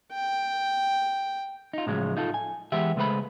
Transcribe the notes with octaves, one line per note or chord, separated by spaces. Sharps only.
G5
D#4 F4
A2 C#3 F3 F#3 G#3 F4
D#4 F4 A4
G#5
E3 G#3 B3 G4 E5
C#2 G#3 A3 B4 C5 B5